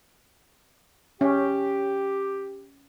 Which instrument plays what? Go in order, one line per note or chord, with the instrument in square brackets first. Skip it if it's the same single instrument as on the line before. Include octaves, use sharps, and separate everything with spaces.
[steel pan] C#4 [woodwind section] G4